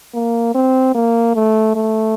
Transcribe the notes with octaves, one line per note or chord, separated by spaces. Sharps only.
A#3
C4
A#3
A3
A3